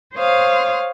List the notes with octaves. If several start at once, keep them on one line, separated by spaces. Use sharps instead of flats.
C5 C#5 F5 D#6